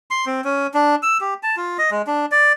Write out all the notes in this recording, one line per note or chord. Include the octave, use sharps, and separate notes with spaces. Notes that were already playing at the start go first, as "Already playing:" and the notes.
C6
C4
C#4
D4
E6
G4
A5
F4
D#5
G#3
D4
D5